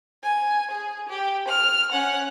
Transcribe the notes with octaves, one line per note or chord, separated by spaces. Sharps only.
G#5
G#4
G4
F6
C#4 F#5